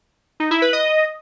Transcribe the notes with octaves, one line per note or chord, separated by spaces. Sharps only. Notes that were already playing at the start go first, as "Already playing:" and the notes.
D#4
E4
B4
D#5